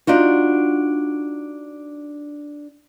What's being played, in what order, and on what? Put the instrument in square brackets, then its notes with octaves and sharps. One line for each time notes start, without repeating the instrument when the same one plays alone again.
[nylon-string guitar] D4 D#4 F4 F#4